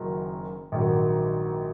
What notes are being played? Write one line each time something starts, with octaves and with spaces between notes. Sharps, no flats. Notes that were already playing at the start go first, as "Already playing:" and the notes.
Already playing: F#1 F#2 D#3
A#1 G#2 D#3 F#3